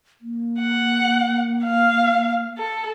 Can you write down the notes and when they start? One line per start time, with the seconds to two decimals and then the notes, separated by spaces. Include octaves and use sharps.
0.21 A#3
0.60 F#5
1.64 F5
2.58 A4